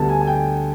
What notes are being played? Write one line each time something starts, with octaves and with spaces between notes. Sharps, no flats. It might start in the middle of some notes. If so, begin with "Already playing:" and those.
Already playing: D2 D3 G3 B3 A5
G#5
G#5
G5